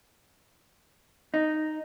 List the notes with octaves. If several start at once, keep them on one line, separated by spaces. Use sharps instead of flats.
D#4